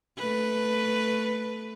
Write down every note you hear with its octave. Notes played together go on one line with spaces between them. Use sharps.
A3 B4